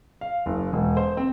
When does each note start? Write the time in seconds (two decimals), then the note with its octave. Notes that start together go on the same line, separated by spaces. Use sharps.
0.21 F5
0.46 F#1
0.73 E1
0.97 C5
1.17 C4